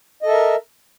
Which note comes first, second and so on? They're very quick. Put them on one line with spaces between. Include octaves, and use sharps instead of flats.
D#5 A4 E5 A#4